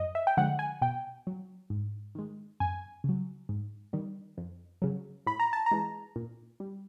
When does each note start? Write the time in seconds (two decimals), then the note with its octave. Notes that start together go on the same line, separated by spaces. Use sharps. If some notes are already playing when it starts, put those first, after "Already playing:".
Already playing: F#2 D#5
0.15 E5
0.27 G5
0.37 D3 F3 G#3 F#5
0.59 G#5
0.81 B2 G5
1.27 F#3
1.70 G#2
2.15 D#3 G#3
2.60 F#2 G#5
3.04 C#3 F#3
3.49 G#2
3.93 D#3 G3
4.37 F2
4.82 C#3 F#3
5.26 A2 B5
5.40 A#5
5.53 A5
5.66 A#5
5.71 E3 G#3
6.16 A#2
6.60 G3